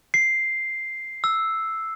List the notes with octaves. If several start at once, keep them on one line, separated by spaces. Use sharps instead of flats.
C7
E6